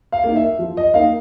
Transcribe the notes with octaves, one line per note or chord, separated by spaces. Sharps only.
F5
A#3 D#4
E5
F3
D#5
A#3 D#4 F5